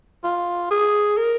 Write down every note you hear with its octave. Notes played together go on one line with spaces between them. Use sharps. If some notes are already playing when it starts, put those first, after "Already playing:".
F4
G#4
A#4